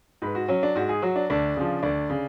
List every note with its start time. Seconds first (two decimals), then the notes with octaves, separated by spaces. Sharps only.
0.22 G#2 B4
0.35 F#4
0.48 F#3 C#4
0.63 D4
0.76 G#2 F#4
0.89 G#4
1.02 F#3 F#4
1.16 D4
1.30 D2 D4
1.56 C#3 F3
1.83 D2 D4
2.10 C#3